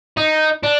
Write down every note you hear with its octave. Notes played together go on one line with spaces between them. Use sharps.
D#4
D4